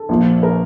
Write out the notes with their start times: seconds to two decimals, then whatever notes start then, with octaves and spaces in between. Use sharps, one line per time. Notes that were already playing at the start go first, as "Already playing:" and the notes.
Already playing: A4
0.09 A#1 A#2 F3
0.43 A#4